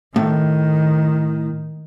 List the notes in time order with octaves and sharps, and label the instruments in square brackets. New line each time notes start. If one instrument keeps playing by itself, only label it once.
[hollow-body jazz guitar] A2 [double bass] D#3